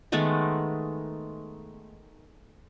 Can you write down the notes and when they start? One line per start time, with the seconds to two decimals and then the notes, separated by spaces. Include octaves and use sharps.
0.12 D#3 G#3 A3 B3